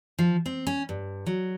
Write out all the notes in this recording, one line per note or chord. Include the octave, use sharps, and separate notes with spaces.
F3
C4
C#4
G2
F#3